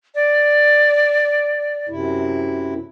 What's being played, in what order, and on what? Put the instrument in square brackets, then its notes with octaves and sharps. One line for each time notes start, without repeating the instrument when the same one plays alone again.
[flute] D5
[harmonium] F#2 C3 E4